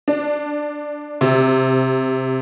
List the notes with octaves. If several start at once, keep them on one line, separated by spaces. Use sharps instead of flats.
D4
C3